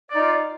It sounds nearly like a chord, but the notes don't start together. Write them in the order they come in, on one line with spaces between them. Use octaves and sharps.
D5 D#4 F4